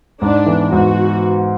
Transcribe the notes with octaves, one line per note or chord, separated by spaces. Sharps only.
G#2 D4
E3 B3
G#2 F#4